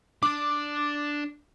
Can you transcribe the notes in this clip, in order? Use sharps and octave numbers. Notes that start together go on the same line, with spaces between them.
D4 D5 D6